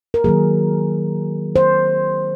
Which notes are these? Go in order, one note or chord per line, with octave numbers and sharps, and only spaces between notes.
A#4
D#3 F#3 A#3 G#4
C5